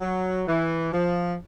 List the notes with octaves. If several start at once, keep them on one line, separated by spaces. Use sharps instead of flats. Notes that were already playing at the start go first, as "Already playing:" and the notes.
F#3
E3
F3